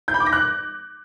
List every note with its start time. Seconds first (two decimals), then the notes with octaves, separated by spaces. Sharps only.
0.08 G6
0.14 B5
0.20 D6
0.26 A#6
0.33 F#6